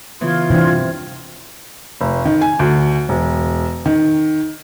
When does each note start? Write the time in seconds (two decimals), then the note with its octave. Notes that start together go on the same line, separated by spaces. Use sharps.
0.21 C#3 E3 B3 F4 C6 G#6
0.50 G2 C3 E3 C4 D4
2.01 F1
2.25 D#3
2.41 G#5
2.59 D2
3.09 E1
3.86 D#3